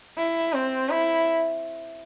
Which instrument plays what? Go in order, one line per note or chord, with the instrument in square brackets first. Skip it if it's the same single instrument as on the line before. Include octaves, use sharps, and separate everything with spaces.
[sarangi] E4
C4
E4